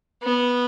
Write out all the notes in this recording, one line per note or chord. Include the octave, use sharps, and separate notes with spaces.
B3